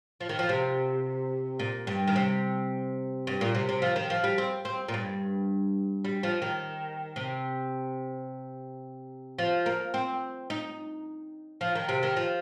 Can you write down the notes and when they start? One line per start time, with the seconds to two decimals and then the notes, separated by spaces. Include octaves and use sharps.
0.20 F3
0.29 D#3
0.39 F3
0.49 C3
1.59 A#2
1.87 G2
2.07 D#3
2.16 C3
3.27 G2
3.41 A#2
3.55 C3
3.69 C3
3.82 F3
3.96 D#3
4.10 F3
4.24 G3
4.38 C4
4.65 C4
4.88 A#2
4.94 G2
6.05 G3
6.23 F3
6.42 D#3
7.16 C3
9.39 F3
9.66 A#3
9.94 C4
10.50 D#4
11.61 F3
11.75 D#3
11.89 C3
12.03 D#3
12.16 F3